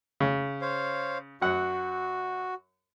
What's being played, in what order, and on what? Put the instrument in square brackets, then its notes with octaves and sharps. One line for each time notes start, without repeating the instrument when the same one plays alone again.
[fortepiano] C#3
[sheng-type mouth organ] C5 C#5 F5
[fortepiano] F#2 F#5 [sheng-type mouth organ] F#4